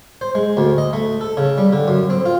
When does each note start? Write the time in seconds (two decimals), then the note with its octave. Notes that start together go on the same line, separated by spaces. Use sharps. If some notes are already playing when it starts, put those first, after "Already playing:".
0.21 C5
0.35 G#3
0.57 D2
0.78 D#5
0.93 A3
1.21 A4
1.37 C#3
1.58 G3
1.73 D3
1.88 F#2
2.10 C4
2.25 F4